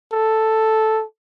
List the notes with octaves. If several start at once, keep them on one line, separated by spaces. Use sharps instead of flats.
A4